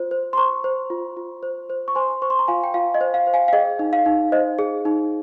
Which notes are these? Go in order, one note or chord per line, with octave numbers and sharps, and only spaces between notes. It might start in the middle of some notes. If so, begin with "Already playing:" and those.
Already playing: F4 C5
C5
C6
C5 A#5 C#6
C5
F4
F4
C5
C5
C#6
C5 G#5 C6
C5 C#6
C6
A#5
F4 F5 G#5
G5
F4 F5
D#5
C5
F5
C5
F5 G#5
F5
G#4 D#5 G5
D#4
F5
D#4
C5 D#5
G#4
D#4